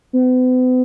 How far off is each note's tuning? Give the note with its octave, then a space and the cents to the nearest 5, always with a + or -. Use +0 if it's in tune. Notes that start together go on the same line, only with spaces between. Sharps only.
B3 +45